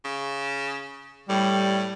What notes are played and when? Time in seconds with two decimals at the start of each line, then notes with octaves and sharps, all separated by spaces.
0.04 C#3
1.29 A2 G3